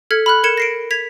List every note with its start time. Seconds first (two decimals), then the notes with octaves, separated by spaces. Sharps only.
0.11 A4 F6 G#6 B6 C#7
0.26 B5 F6 F#6
0.43 A#4 G#6 C#7 E7
0.57 A#6 C7 D7
0.91 G#6 B6 F7